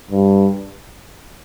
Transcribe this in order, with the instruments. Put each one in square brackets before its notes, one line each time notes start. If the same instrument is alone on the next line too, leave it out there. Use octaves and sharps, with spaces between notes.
[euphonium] G2